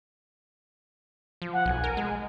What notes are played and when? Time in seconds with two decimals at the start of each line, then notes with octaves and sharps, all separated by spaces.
1.42 F3
1.53 F#5
1.66 B1 G#5
1.84 A#4
1.97 G#3